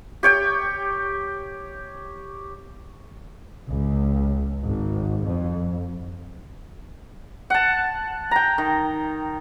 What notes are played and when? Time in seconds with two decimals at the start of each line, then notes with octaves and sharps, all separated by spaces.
0.23 G4 C#5 G5
3.67 C#2
4.63 G#1
5.25 F2
7.50 F#5 A5
8.31 G5 A#5
8.58 D#3